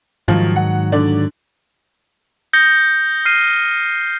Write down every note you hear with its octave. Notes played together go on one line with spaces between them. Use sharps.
G#2 D#3 F3 F#3
F#5
D3 D5
D#6 G6 A#6 C#7 G7
F6 C7 D#7